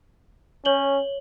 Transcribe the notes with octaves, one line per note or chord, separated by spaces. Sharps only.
C#4 C#5 F#7 G7